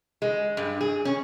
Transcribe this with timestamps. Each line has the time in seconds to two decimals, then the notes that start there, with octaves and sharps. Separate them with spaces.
0.22 G#3
0.57 G2
0.81 G#4
1.05 C#4